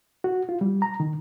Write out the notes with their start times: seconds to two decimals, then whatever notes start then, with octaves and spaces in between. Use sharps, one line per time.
0.24 F#4
0.49 F4
0.61 G3
0.82 A#5
1.00 D#3